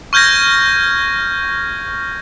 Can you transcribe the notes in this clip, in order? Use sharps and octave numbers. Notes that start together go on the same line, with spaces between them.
C#6 F6 G6 G#6 A#6